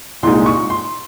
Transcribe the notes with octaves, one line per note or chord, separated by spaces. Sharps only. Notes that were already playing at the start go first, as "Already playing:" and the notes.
C2 A#2 G#3 D#4 C6
C#6
C6